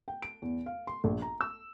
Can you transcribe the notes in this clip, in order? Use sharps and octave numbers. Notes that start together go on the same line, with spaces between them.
G5
D7
E2
F5
C6
A#1
A#5
E6